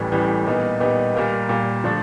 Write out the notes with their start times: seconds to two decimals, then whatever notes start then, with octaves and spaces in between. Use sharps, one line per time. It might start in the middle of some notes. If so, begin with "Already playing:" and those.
Already playing: A1 A2 E3 G3
0.12 A1 A2 E3 G3
0.46 A#2 G3 B3 D#4
0.80 A#2 G3 B3 D#4
1.15 A#2 G3 A#3
1.49 A#2 G3 A#3
1.84 D3 F3 A3 D4